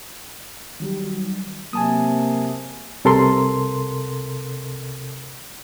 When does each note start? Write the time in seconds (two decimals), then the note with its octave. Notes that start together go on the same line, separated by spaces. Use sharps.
0.80 D#3 F#3 G3
1.73 C3 F#3 A#3 G#5 A5 D#6
3.05 C2 C3 A4 A#4 C6